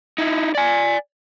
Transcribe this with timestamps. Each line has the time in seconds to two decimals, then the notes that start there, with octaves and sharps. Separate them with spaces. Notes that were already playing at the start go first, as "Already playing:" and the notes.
0.18 D#4 E4
0.55 D5 G#5